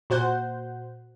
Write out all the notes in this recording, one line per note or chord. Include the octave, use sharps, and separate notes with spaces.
A#2 F#4 C5 F#5 G6